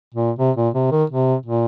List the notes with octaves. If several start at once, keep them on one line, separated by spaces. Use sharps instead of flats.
A#2
C3
A#2
C3
D#3
C3
A#2